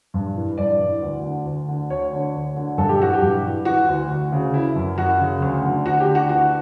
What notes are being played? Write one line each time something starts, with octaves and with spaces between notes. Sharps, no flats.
G2
E3
G2 D5
E3
D2
D3
D2
D3
D2 C#5
D3
D2
D3
G2 A4
G4
E3 F#4
G4
G2
E3
E3 F#4
D2
D2
C#3
E3 E4
F#2
F#2 F#4
C#3
D2
D3
D2 F#4
G4
D3
F#4
E3 F#4